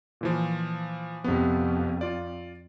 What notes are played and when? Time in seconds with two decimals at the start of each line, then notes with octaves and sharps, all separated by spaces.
0.21 A#2 E3 F3
1.24 F2 C3 B3
2.01 F4 D5